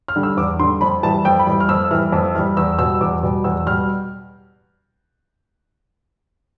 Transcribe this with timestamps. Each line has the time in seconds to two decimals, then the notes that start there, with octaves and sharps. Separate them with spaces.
0.08 F6
0.16 D3 G3
0.23 E6
0.37 E2 D6
0.60 D3 G3 C6
0.81 F2 B5
1.03 E3 G3 A5
1.25 F2 G5
1.39 B5
1.47 E3 G3
1.60 F6
1.69 F2 E6
1.91 E3 G3 F6
2.12 F2 E6
2.35 E3 F6
2.39 G3
2.57 E2 E6
2.79 B2 E6
2.83 G3
3.01 E2 D6
3.23 B2 G3
3.44 E2 E6
3.67 G3 F6
3.70 B2